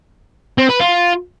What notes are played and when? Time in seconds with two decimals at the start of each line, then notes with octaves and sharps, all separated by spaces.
0.58 C4
0.69 B4
0.80 F4